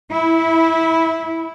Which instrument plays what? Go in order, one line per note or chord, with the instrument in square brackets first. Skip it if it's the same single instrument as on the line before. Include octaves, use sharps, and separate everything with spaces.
[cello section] E4